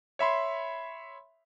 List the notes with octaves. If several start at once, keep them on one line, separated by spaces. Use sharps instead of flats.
C#5 E5 B5 C6